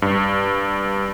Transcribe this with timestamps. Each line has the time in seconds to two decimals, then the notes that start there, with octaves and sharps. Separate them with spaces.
0.02 G2